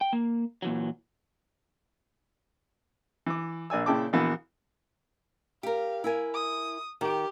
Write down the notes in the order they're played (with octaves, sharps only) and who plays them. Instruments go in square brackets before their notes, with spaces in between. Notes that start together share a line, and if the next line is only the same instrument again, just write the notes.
[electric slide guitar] G5
A#3
A#2 E3 F#3
[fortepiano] E3 D6
A#1 D5 G#5 E6
A#2 C#3 E4 G5 A5 D6
A#1 E3 B3 F#4
[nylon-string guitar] G4 A#4 [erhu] F5
[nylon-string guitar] E4 A#4 G#5
[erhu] D#6
[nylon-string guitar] D#3 [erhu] G4